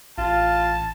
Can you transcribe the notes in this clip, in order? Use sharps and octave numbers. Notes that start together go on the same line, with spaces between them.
A1 F4 A5